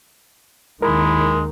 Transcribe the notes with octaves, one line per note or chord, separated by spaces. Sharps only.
D#2 D#3 G#3 E4 A#4